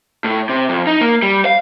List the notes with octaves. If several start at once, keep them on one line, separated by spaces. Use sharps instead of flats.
A2
C3
F2
D#4
A#3
G3
F5